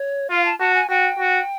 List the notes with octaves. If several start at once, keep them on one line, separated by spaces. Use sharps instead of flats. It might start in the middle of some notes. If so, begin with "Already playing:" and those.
Already playing: C#5
F4 F5
A5
F#4 A5
G#5
F#4 G5
F#4